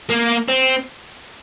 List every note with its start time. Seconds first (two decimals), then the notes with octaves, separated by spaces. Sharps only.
0.10 A#3
0.48 C4